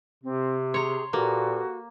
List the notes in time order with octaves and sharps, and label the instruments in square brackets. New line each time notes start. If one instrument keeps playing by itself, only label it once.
[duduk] C3 [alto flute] C4
[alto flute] G#4 [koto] C#5 A#5 [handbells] C6
[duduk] A#2 [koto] A#3 [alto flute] F#4 [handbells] G4 A4 B4